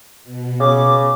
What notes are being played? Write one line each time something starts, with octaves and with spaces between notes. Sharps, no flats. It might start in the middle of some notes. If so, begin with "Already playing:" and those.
B2
C#3 D6